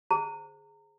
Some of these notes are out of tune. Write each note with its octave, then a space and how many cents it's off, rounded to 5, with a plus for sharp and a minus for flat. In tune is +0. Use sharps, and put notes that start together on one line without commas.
G#4 +0 C5 +0 A#5 -30